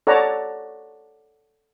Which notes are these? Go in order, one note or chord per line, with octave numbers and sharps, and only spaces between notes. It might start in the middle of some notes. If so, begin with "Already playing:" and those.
A4 C#5 D5 F#5 A5 A#5